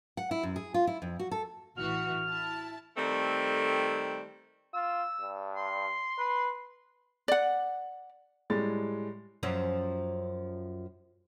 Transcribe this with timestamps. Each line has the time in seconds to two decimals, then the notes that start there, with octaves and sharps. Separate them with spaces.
0.17 F#5
0.31 E4
0.43 F#2
0.56 G#4
0.74 F4
0.87 E4
1.02 F2
1.19 F#4
1.31 A4
1.77 A1 E3 F#4 F6
2.29 E4 A5
2.96 D#3 G3 A3 C4 A4
4.74 F4 E6
5.20 G2
5.56 C6
6.18 B4
7.28 D5 F#5
8.50 A2 G3 G#3 A6
9.43 F#2 F3 C#4